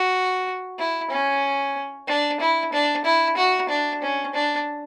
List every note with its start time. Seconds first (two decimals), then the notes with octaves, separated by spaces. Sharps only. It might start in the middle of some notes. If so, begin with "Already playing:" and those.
Already playing: F#4
0.79 E4
1.10 C#4
2.08 D4
2.40 E4
2.73 D4
3.05 E4
3.37 F#4
3.69 D4
4.02 C#4
4.34 D4